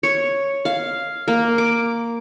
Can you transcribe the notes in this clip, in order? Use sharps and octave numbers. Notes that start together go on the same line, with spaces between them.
C#5
F5
A#3
D6